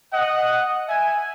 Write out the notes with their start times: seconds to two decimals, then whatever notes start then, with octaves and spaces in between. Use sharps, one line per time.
0.12 D#5 F#5
0.88 E5 G#5